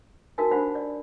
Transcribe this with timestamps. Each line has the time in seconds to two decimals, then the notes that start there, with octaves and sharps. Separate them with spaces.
0.38 D#4 F#4 A#4 G#5
0.51 D4 G4 C5 F#5 B5
0.75 D5